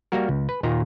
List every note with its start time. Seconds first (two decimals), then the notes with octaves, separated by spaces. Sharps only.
0.12 G3 A#3 F#4 A#4
0.29 C#2
0.49 B4
0.63 D#2 A#2 D#3 A#5